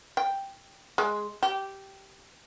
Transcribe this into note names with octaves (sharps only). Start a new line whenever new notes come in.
G5
G#3
G4